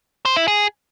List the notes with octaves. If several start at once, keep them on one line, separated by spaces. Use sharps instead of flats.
C5
E4
G#4